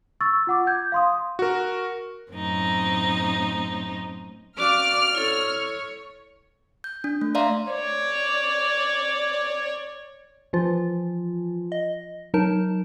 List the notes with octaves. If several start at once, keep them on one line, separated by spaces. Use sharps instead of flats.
C#6 E6 A6
F4 F#5 D6
G6 G#6
F5 C6 D#6
F#4 A#4
F#2 A2 C4 D#4
C#4 F#4 D5 F5 F6
E4 A4 C#5
G6
D4
A3
D5 E5 F5 A#5 C6
C#5 D5
E3 F3 F4
D#5
F#3 D#4 A#4 A5